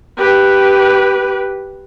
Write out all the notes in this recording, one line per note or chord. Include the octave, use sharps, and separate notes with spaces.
G4 B4